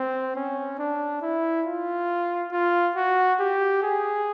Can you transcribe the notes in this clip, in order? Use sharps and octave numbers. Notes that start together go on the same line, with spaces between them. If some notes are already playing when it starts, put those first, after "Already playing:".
Already playing: C4
C#4
D4
E4
F4
F4
F#4
G4
G#4